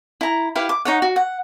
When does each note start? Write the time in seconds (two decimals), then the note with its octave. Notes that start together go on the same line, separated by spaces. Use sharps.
0.21 E4 A#5
0.55 E4 G4 B4 F5
0.69 D6
0.85 D#4 C#5 F#5
1.02 F#4
1.16 F#5